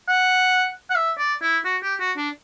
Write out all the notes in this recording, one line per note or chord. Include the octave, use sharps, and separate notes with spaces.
F#5
F#5
E5
D5
E4
F#4
G4
F#4
D4